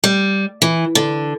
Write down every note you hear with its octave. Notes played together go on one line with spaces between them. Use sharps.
G3
E3
D3